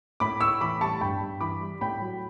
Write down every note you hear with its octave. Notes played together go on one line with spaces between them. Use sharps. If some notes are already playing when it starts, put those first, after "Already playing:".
A2 B5 D6
A2 C#6 E6
E3 B5 D6
G3 A5 C#6
G2 G5 B5
G2
E3 B5 D6
G3
A2 G5 B5
F#3